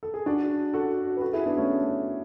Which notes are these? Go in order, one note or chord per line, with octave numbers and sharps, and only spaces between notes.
A4
G#4
D4 F#4
F#4 A4
B4
F#4 A4
E4 G#4
B3 D4
A3 C#4